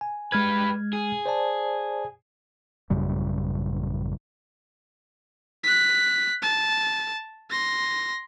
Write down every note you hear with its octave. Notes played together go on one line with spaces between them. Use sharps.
G#5
G3 G#3 B4 F6 G#6
G#4
C5 D5 A5
A1 F#2 C#3 G3
F#6 B6
A5
C6 A#6